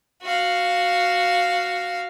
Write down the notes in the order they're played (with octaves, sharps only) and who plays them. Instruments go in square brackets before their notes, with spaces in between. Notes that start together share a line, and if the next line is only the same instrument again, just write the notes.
[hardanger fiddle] F#4 F5